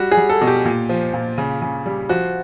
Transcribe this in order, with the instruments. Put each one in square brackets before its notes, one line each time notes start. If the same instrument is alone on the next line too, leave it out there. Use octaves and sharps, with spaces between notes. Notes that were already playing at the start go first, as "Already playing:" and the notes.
Already playing: [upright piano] G3 F#4
G#4
G3
A4
B2
G4
A#2
F3
A#2
C#3
C#3
G3
F3 F#4